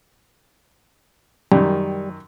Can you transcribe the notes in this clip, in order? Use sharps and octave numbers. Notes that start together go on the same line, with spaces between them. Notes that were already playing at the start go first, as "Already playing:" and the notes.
F#2 D#3 G3